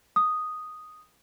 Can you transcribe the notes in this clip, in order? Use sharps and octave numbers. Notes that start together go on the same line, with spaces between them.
D#6